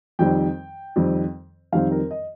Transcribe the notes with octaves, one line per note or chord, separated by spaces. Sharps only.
F2 D#3 G3 C4 G5
F2 D#3 G3 C4
F2 D#3 G3 C4 F5
A#4
D#5